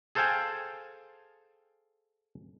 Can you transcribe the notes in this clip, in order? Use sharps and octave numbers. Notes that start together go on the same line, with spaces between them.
G#4 A4 C5 F5 G5 G#5